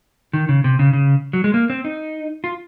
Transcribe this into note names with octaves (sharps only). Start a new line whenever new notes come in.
D#3
C#3
C3
C#3
C#3
F#3
G#3
A#3
C4
D#4
F4